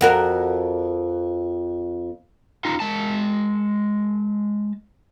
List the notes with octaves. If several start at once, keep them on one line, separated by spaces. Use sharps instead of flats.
F2 F#4 A#4
D#4 F4
G#3 A5